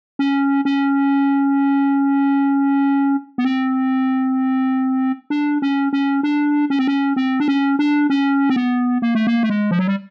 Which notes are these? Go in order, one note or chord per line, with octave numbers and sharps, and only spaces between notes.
C#4
C#4
B3
C4
D4
C#4
C#4
D4
C#4
C4
C#4
C4
D4
C#4
D4
C#4
C4
B3
A#3
A3
A#3
A3
G#3
F3
F#3
G3